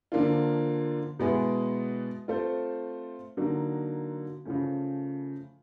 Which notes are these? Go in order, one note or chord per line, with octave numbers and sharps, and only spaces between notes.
D3 F3 A#3 D4 F4
B2 G#3 B3 E4 G#4
A3 C4 F4 A4 C5
D3 F#3 A#3 D#4 F#4
C#3 F3 A3 C#4